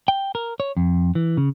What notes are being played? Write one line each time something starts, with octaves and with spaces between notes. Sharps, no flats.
G5
A#4
C#5
F2
E3
C#3